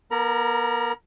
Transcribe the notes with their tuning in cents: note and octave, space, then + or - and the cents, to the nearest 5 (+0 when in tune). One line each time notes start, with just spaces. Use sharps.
B3 -45 A#4 -20 A#5 +35